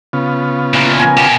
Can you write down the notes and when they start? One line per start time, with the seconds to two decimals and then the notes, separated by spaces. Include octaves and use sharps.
0.13 C#3 B3 F4
0.74 A#2 E3
0.99 A#4 G#5
1.17 B2 G4